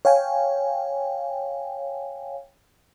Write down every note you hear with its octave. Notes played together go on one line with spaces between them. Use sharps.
C#5 F5 G5 G#5